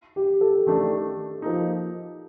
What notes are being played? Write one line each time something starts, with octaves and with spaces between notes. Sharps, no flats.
G4
A4
D#3 A3 D4
F3 A#3 D#4